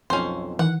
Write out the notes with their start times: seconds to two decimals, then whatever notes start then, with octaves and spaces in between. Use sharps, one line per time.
0.10 B1 F2 C#4 C5
0.59 D#3 E3 F#5